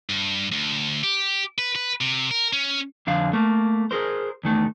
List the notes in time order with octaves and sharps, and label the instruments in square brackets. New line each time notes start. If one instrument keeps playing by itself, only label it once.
[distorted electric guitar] G2
D2
G4
B4
B4
C3
A#4
C#4
[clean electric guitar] F2 D3 F5
A3 A#3
G#4 A#4 C5
E2 D#3 A3